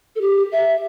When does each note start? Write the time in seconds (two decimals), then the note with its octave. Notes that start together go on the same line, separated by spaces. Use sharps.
0.16 A4
0.21 G4
0.52 E5